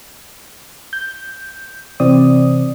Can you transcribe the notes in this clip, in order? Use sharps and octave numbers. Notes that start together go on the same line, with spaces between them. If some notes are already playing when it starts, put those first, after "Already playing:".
G6
C3 E3 C4 D5 D#6